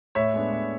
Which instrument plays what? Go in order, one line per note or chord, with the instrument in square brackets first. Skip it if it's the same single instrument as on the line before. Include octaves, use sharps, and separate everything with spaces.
[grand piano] A2 C#5 E5
G#3 B3 D4
A2